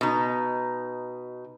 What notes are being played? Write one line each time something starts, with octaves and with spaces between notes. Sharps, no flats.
B2 D#4